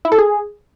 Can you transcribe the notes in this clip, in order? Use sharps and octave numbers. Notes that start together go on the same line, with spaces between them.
E4
A4
G#4